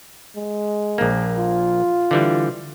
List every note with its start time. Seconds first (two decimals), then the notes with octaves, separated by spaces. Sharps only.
0.36 G#3
0.98 A#1 A#3
1.39 F4
2.11 D3 E3 G3